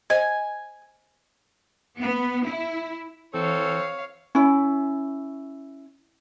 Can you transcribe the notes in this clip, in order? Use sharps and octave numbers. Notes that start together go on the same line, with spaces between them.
C5 D#5 G#5
B3
E4
E3 C4 A4 C#5 F5
C#4 E4